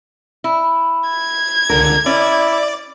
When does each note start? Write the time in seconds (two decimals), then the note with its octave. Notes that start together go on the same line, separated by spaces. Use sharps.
0.44 E4
1.09 G#6
1.69 C#2 D3 A#4
2.06 C#4 E4 D5